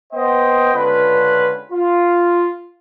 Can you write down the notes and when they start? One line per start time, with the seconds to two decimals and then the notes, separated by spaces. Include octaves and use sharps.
0.13 B3 C5 D#5 G5
0.74 C#2 D3 C#4 F4 B4
1.72 F4